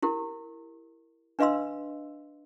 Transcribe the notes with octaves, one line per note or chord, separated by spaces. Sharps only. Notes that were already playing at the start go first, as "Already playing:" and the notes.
E4 G4 A#4
D4 B4 D#5 F5 C6 E6